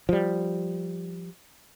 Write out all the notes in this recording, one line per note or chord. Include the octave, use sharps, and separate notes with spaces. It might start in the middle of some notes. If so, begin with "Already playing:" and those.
F3 G3